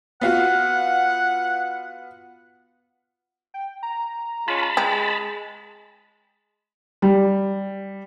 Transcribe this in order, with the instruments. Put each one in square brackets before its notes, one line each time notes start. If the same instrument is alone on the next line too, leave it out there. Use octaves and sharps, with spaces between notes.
[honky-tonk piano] B3 F4 F#4 [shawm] F#5
[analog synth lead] G5
A#5
[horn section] G#3 C#4 F4 [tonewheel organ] A5 B5
[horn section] G#3 [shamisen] G4
[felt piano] G3